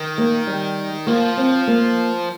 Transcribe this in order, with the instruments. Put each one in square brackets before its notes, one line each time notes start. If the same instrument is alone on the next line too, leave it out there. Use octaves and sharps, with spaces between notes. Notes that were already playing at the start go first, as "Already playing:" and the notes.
Already playing: [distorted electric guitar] D#3
[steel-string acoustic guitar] A#3
G3
[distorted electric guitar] F3 [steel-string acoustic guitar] A#3
[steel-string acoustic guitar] C4
A#3